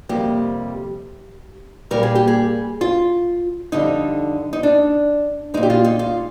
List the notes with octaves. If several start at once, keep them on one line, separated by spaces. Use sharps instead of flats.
F2 C3 G3 A#3 G4
A#2 G3 A#3 A#4
G#4
G4
G#4
F4
F2 D3 G3 D#4
D#4
D4
A#2 G#3 D#4
G4
F4
D#4
F4